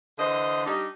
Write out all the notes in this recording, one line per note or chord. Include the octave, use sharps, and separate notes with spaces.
D3 E3 C5 D#5
G3 D4 D#4